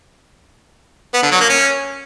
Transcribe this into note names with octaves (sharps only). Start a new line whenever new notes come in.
B3
D3
F#3
A#3
C#4